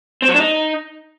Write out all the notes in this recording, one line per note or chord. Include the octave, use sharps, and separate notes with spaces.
C4
F#3
D4
D#4